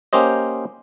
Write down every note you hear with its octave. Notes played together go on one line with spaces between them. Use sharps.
A#3 C#4 G4 C5 D#5